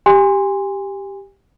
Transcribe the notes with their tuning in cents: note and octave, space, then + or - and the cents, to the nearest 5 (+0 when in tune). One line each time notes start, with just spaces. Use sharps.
G4 +0 G#5 -30 C6 +0